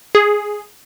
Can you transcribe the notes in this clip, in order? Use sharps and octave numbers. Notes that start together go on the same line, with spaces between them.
G#4